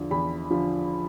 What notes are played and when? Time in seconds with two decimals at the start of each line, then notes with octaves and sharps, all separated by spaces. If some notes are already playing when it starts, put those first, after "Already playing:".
Already playing: E2 D3 F3
0.11 E2 B5
0.51 D3 F3